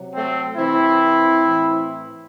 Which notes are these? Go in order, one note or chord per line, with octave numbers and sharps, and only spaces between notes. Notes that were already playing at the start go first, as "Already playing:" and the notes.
Already playing: C3 F#3
A3 C4
C3 E3 C4 E4
A2 E3